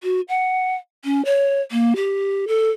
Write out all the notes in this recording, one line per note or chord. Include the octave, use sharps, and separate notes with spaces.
F#4
F#5
C#4
C#5
A#3
G4
A4